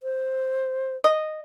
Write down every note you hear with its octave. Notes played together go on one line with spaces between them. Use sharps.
C5
D#5